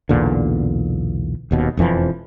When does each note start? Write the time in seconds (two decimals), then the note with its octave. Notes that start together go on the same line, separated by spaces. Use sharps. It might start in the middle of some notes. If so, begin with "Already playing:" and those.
0.09 B1 E2 A#2 D3
1.51 D#1 D#2 B2
1.77 E1 F2 E3 F3